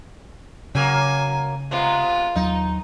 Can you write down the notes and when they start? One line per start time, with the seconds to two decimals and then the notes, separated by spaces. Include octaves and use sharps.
0.75 C#3 F#3 A#3 G#5
1.71 C3 G#3 B3 F4
2.36 D#2 F#3 D#4